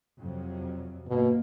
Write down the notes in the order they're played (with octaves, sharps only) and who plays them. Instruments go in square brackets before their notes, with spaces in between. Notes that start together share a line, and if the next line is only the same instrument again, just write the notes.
[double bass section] F2 C3 F#3
[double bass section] G1 A#3 [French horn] B2